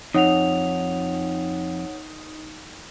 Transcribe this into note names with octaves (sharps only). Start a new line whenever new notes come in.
F2 D#4 C#5 F#5 F7